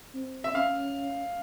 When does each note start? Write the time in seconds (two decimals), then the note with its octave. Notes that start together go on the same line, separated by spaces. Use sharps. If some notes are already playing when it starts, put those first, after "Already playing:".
0.15 C4
0.44 E5
0.54 C#4 F5